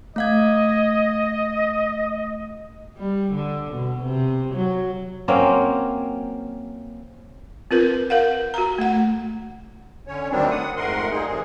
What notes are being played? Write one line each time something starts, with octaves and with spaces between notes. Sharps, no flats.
A3 D#5 F5 G#6
G3
D3
B2
C3
F#3
F#3 A#3 C4 C#4
C4 F4 A#4 B4
A#4 F5 F#5
F#4 A#5
A3 F#5
D3 C#4 C#5
D2 D#3 F#3 G3 C4 D4
F#5 D#6
F2 G#2 A3 A#4 F#5 C6
G3 A#3 D#4 G#4
C3 D#3 E3 F#3 G#4